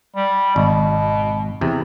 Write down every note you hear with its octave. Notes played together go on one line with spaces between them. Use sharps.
G3
G#1 B2
E2 C3